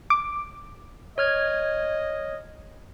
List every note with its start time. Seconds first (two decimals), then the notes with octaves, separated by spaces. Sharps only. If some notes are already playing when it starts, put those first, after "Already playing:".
0.10 D6
1.18 C#5 D#5 F6 G#6